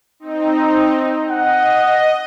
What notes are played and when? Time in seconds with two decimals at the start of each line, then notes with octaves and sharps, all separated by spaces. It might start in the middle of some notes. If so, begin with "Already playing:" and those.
0.20 C4 D#4
1.30 D#5 F#5